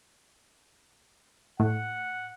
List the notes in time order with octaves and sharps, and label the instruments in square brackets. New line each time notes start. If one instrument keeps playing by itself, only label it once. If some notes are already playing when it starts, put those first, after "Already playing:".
[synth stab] A2 [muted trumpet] F#5